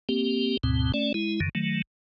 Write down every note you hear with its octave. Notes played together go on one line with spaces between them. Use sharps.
A#3 C4 G4
D2 G#2 B2 C4
A3 C#4 D5
G#3 E4
F#2 D3 D#3
D#3 F#3 A3